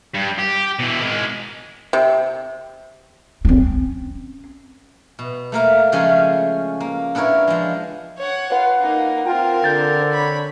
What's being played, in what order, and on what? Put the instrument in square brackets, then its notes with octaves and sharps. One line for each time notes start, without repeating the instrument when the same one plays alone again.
[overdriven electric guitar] G2
G4
B2 E3
G#3 A#4
[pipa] C3
[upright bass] C4 C#4
[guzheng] B2
A3 A#3 A#4
C#3 F3 G#3 A3 C#4 G#5
A#3
B3 D4 E4 A#4 C#5
F3 G#3
[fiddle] C#5 F#5
[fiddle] F4 [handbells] B4 F#5
[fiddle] A#3 D#4
[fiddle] C4 A#4 [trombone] F4 [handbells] G5
[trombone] D3 [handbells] G6 A6
[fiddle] C#5 B5